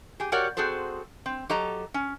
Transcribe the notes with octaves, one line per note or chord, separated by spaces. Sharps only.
G4 G#4
F#4 G4 A#4 C#5 D5 F#5
C4 F#4 G#4 A4 C5
C4
F#3 G4 A4 D#5 A#5
C#4